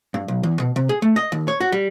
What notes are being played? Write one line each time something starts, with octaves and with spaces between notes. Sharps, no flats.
G2
B1
E2
B2
C3
G#4
A3
D#5
D#2
C#5
F#4
G3